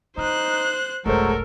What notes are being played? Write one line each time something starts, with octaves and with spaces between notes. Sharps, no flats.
D#4 F4 C5 F#6
F1 B1 F#3 G#3 A3 A4 A#4 C5